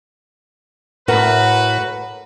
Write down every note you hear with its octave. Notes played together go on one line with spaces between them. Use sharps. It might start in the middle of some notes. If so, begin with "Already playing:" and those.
A2 F#4 A#4 B4